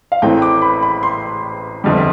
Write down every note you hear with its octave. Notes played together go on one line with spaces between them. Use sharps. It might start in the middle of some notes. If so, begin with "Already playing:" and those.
F5
A1 A2 E3 A3 C4 G5
D6
B5
B5
C6
G1 F2 D3 G3